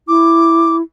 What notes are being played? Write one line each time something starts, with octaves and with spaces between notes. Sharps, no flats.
E4 D6